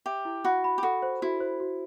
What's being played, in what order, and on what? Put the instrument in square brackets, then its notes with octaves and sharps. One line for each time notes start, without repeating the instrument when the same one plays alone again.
[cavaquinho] G4 [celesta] E5
[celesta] E4
[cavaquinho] F#4 [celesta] B5
[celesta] B5
[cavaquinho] G4
[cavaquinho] F#4 [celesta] A4
[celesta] C5
[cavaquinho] E4 [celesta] F#4
[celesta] C5
F#4